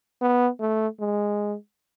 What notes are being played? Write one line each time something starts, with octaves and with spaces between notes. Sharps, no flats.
B3
A3
G#3